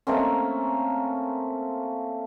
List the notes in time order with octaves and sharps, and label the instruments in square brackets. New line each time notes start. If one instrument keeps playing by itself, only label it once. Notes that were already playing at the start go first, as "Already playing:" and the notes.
[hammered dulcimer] A3 A#3 C4 C#4